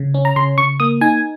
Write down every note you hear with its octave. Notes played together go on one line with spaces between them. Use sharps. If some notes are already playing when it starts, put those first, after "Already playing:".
Already playing: C#3
C#4
A#5
C#3 C6
C#3 C#6
A#3 D#6
D#4 G#5